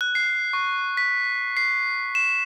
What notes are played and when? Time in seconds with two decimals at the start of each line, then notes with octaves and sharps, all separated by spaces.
0.01 F#6
0.15 C7
0.53 C#6
0.97 B6
1.57 C7
2.15 E7